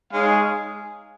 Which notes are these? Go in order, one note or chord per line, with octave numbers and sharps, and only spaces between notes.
G#3 D#4 G#4 C#5 F5